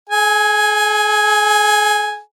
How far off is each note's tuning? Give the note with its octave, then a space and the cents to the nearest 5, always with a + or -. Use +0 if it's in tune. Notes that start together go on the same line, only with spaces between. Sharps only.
G#4 +45 G#5 +0